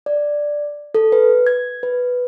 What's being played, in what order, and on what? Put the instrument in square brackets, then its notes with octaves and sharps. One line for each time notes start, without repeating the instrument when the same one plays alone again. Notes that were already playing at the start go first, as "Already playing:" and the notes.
[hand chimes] D5
A4
B4
G#6
B4